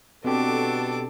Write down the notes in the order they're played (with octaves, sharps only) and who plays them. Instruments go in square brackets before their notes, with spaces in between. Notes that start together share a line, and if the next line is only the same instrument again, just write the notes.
[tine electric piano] B2 G4 [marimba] C4 [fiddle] D4 D6 [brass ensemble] F#4 A4 B4